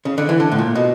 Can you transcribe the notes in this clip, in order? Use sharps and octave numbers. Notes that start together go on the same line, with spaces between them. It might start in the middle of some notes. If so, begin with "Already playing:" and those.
C#3
D3
E3
D3
A2
A#2
B2